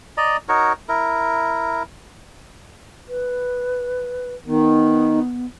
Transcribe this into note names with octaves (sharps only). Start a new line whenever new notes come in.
D5 D#5 A#5
D#4 F#4 A#4 C#5
E4 A#4
B4
D#3 B3